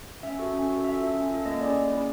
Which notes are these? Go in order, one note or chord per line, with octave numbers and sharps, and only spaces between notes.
C#4 E5
F#4 A4
C#4
F#4 A4
C#4 E5
F4 A4
C#4
F4 A4
A#3 D#5
C#4 E4 G#4 D5
A#3
C#4 E4 G#4